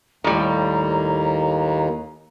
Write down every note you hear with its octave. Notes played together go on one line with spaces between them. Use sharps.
D#2 A2 G3 A#5